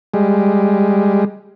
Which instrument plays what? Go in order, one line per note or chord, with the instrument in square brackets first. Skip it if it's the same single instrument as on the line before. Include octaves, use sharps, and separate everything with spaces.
[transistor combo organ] G3 G#3